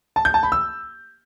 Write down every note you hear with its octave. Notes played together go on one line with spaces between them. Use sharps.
A5
G6
A5
B5
E6